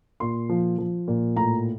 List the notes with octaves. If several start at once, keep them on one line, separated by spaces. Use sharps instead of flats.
A#2 C6
F3
F3
A#2
A2 A#5